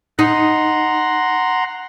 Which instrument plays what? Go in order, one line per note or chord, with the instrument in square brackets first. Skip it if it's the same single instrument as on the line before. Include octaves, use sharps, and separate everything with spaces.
[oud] D#4 [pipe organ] F#5 A#5 C6